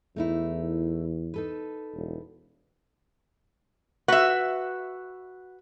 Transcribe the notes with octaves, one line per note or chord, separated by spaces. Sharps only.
E2 A3 D#4 E4
D#4 A4 B4
E1
F#4 B4 E5